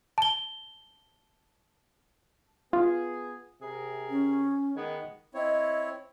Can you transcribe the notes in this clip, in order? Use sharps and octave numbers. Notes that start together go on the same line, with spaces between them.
A5 G7
B3 F4 G#4
C3 G#4 A#4
C#4
D#3 G#3 B3
C4 E4 C#5 D#5